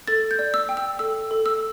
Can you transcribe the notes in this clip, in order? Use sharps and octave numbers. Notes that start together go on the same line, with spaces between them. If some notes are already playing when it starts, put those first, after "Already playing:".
A4 A6
G6
D5
E6
G5
E6
A4 E6
A4
E6